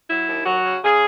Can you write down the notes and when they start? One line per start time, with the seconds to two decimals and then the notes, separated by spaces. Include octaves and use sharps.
0.09 F#3 E4
0.27 D#2
0.45 F#3 F#4
0.64 C#3
0.82 C#3 G#4